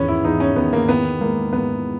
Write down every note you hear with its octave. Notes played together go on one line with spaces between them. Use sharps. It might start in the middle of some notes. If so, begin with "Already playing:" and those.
Already playing: E2 D#3 B3 C#4
E4
E2 D#4
C#4
D#3 B3
A#3
D#3 B3
G#2 A#3
G#2 B3